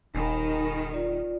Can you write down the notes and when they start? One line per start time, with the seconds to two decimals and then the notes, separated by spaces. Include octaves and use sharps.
0.15 D#1 D#3 G#5 B5
0.93 F4 D5